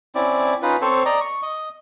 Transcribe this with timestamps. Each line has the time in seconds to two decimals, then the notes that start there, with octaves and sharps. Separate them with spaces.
0.15 C4 C#4 E4 D5
0.62 C#4 D#4 F4 B4
0.81 C4 A4 C5 C#5
1.05 D5 D#5 A#5
1.21 C#6
1.42 D#5